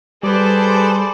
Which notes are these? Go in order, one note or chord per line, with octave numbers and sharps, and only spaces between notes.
G3 G#4 A4 B4 C5 D5